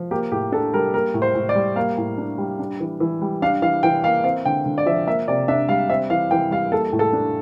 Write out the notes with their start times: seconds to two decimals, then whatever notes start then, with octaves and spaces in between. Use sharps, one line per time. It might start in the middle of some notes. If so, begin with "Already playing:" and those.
Already playing: F3
0.11 A#3 G4
0.31 A2 G4
0.52 D4 A4
0.74 G3 A#4
0.93 A#3 A#4
1.14 A2
1.22 C5
1.35 A2
1.49 D5
1.55 G3
1.76 A#3 F5
1.97 A2
2.18 D4
2.38 G3
2.59 D4
2.80 E3
3.00 E3
3.22 G3
3.42 D4 F5
3.62 E3 F5
3.83 E3 G5
4.04 A#3 F5
4.24 C4 F5
4.45 D3 G5
4.66 D3
4.78 D5
4.86 F3 E5
5.07 A#3 E5
5.28 C3 D5
5.48 D4 E5
5.69 G3 F5
5.90 C4 E5
6.10 E3 F5
6.31 E3 G5
6.51 G3 F5
6.72 A#3 A4
6.93 A2
6.99 A4
7.13 D4